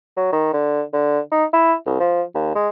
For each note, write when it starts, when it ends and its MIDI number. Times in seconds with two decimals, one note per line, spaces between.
0.17 0.28 54
0.32 0.51 51
0.53 0.83 50
0.93 1.19 50
1.32 1.45 63
1.53 1.74 64
1.86 1.99 36
2.00 2.22 53
2.34 2.51 39
2.55 2.69 56